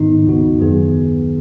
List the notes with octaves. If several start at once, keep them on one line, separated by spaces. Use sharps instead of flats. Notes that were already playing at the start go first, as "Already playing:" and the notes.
Already playing: G#2 D#3 B3 D#4
D#2 C#3 B3 D#4 F#4
F#2 D#3 F#3 B3 G#4